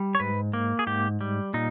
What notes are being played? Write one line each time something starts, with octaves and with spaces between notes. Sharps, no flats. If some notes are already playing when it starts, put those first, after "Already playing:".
Already playing: G3
C#5
G#2 B4
A#3
G#4
G#2 G4
G3
A#2 D#4